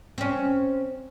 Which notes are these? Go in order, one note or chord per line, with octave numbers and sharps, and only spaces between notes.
C4 C#4